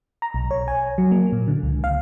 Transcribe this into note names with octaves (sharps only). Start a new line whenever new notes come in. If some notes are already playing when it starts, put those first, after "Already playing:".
A#5
B1
C#5
G#5
F#3
A#3
A#2
D3
C#2
F5